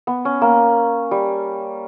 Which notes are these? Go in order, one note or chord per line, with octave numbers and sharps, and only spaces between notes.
B3
C#4
A#3
G3